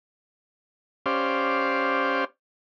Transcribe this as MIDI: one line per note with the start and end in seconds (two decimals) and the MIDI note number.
1.06 2.25 61
1.06 2.25 67
1.06 2.25 72
1.06 2.25 74
1.06 2.25 77